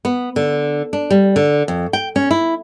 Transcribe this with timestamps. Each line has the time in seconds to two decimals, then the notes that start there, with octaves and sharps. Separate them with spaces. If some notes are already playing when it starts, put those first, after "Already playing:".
0.05 B3
0.36 D3
0.93 D4
1.10 G3
1.36 D3
1.68 F2
1.93 G5
2.16 C#4
2.31 E4